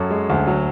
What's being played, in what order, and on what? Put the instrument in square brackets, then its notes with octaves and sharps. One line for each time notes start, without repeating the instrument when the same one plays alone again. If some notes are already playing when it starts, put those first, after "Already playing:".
Already playing: [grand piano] F#2 A4 C#5
G#3
D2
F#3